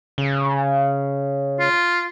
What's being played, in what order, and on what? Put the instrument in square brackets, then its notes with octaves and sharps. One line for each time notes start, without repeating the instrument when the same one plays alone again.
[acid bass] C#3
[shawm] F4